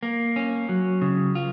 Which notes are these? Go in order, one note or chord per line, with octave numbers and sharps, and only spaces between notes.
A#3
C#4
F#3
C#3
F4